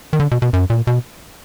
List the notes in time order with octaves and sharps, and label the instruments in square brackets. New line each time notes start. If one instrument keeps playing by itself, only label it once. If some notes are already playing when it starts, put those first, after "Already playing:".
[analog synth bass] D#3
D3
B2
B2
F#2
A#2
B2